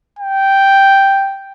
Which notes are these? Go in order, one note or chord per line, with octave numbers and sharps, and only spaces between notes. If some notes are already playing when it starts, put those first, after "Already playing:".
G5